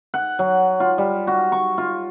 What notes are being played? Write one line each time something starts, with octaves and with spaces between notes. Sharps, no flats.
F#5
F#3
F4
G3
F#4
C#6
F4